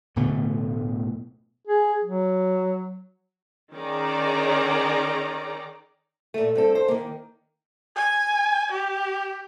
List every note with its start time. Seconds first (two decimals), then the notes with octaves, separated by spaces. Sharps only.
0.16 D1 B2 D3 A3
1.66 G#4
2.04 F#3
3.73 D#3 C#4 D#4 G#4 D5 A#5
6.34 A#2 A3
6.55 G2 C4 A4
6.75 C5
6.88 D#3 A#3
7.96 G#5
8.71 G4